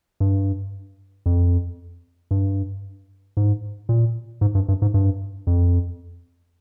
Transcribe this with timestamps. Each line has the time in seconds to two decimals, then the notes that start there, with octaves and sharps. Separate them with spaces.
0.20 G2
1.26 F2
2.31 G2
3.37 G#2
3.89 A#2
4.41 G#2
4.55 G2
4.68 G2
4.82 G#2
4.94 G2
5.47 F2